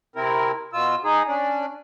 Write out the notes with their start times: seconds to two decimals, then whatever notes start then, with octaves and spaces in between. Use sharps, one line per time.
0.16 C3 C4 E4 A#4
0.73 B2 F4 E6
1.04 D#4 G#4
1.28 C#4 D4 D5